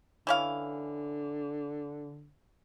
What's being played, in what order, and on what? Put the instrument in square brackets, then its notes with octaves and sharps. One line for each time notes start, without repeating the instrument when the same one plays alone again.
[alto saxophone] D3 [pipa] E3 C#4 F5